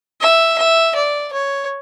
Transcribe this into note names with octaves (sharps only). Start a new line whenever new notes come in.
E5
E5
D5
C#5